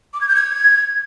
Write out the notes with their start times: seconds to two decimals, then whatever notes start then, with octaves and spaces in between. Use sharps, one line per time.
0.14 D6
0.21 G#6
0.28 G6
0.35 G#6